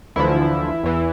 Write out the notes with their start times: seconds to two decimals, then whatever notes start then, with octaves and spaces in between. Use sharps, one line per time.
0.16 D2 D3 E3 F3 E4
0.83 E2 E3